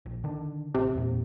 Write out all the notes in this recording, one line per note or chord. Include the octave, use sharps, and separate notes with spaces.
A#1
D3 D#3 D4
A1 C3
E2 A#2